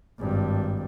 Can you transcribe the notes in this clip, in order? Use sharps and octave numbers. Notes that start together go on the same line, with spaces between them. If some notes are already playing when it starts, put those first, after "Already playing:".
G#1 G2